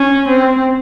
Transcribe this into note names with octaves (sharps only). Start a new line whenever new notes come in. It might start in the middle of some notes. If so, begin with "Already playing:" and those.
Already playing: C#4
C4